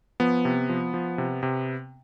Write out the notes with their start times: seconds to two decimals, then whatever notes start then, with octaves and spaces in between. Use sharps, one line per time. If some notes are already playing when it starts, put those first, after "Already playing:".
0.20 F3 B3
0.45 C3
0.69 F3
0.94 F3
1.18 C3
1.43 C3